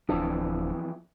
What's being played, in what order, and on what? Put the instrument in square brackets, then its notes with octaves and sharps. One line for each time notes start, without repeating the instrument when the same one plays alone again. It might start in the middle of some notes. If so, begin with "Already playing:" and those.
[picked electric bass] D1 F3 D4 [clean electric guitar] F2 E3